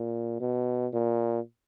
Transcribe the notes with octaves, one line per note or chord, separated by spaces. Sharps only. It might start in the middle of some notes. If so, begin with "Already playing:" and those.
Already playing: A#2
B2
A#2